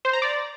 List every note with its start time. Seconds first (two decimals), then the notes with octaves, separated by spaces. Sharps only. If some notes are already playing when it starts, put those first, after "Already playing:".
0.05 C5
0.13 A#5
0.22 D5